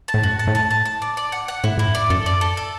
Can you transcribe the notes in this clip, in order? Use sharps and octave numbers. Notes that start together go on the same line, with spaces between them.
A5
A2
F#2 F#4
A5
A2
A5
A5
A5
D5
D5
F#5
F#5
A2 E4
A2 E4
F#2
D5
F#2 A4
D5
A4
A4